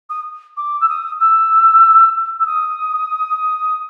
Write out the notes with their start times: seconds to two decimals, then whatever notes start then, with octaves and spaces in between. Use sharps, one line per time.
0.09 D#6
0.57 D6
0.81 E6
0.89 D#6
1.20 E6
2.40 E6
2.46 D#6